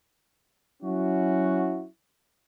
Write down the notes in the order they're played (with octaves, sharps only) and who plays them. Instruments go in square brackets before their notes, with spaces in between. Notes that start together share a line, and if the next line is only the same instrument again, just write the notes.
[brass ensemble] F#3 C#4 E4 F#4